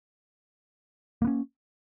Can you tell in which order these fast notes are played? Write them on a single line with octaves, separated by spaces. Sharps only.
A#3 B3 C#4